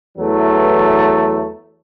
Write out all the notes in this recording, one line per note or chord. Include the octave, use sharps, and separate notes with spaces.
E2 E3 F#3 A3